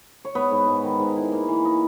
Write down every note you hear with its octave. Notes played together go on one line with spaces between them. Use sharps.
C#5
G#2 B3 B4
G#2
G#2
D#3
G#2
E4
A#3
E3
D#4